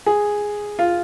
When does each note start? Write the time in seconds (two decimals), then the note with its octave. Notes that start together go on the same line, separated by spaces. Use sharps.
0.06 G#4
0.79 F4